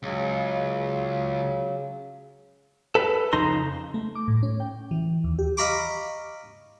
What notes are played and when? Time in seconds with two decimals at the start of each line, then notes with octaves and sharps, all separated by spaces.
0.03 C#2 C#3 F#3
2.95 A4 B4
3.33 F2 C#3 D#4 A#5 C6
3.94 A3
4.15 D6
4.28 A2
4.43 C#4
4.60 G5
4.91 E3
5.24 D#2
5.39 G4
5.57 D#5 F5 A#5 B5 C#6 D6